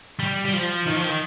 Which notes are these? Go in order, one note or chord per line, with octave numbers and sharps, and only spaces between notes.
G3
G3
F3
D#3
F3
D#3